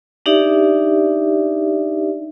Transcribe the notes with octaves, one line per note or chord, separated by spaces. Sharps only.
D4 D#4 G4 D5 E5